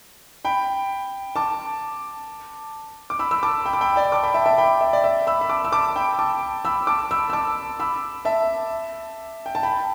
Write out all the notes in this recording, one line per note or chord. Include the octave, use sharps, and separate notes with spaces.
G5 B5
A5 D6
D6
B5 E6
B5 E6
A5 D6
G5 B5
D6
G5 B5
D5 G5
A5 D6
G5 B5
E5 A5
E5 A5
G5 B5
E5
D5
E5
B5 E6
B5
A5 D6
E6
A5 D6
G5 B5
A5 D6
B5 E6
A5 D6
B5 E6
E6
A5 D6
B5 E6
E5 A5
G5
A5
G5 B5